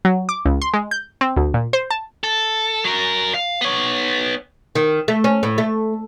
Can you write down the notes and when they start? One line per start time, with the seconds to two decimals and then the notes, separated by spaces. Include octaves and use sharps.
0.05 F#3
0.29 D6
0.46 C#2
0.62 C6
0.73 G#3
0.91 G6
1.21 C4
1.37 D2
1.54 A#2
1.73 C5
1.91 A5
2.24 A4
2.84 F#3 A#4
3.34 F5
3.61 B3 C#5
4.75 D#3
5.08 A3
5.24 C#4
5.43 A2
5.58 A3